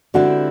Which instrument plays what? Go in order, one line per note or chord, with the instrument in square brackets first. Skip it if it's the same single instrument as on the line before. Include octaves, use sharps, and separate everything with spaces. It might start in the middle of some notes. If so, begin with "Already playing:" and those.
[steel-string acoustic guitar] D3 G3 C4 E4 [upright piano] F#4 F#5